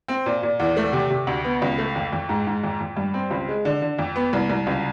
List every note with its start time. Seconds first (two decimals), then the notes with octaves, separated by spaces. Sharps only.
0.08 C4
0.26 A#2
0.43 A#2
0.60 E2
0.77 A3
0.93 C3
1.10 C3
1.27 D2
1.44 B3
1.62 C#2
1.78 A3
1.96 F2
2.13 F2
2.29 G#2
2.47 G#2
2.63 F2
2.80 F2
2.97 G2
3.14 C4
3.31 C#2
3.49 G#3
3.65 D3
3.82 D3
3.99 F2
4.16 B3
4.33 C2
4.50 C2
4.67 C#2